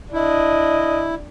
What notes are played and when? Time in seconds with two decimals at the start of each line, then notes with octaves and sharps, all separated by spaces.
0.13 D4 E4 D#5